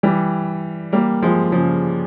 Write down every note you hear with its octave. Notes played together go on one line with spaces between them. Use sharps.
E3 G3
G3 A#3
F3 G#3
C#3 F3